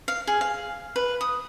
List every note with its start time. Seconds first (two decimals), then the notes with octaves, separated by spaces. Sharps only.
0.08 F5
0.27 G#4
0.41 F5
0.96 B4
1.21 D#6